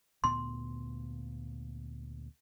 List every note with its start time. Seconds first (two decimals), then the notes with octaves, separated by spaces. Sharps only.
0.24 D2 A#2 B3 C6